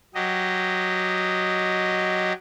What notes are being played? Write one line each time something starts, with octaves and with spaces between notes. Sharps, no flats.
F#3 G4 D#5